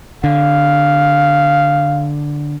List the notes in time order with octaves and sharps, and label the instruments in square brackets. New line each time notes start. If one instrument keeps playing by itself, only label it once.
[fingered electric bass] D3 [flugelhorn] F5